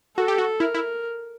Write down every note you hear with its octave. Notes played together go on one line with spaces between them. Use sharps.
F#4 A4
G4
F#4
E4 A#4
E4